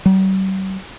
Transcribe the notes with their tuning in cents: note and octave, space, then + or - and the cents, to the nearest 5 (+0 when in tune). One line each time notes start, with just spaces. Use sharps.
G3 -45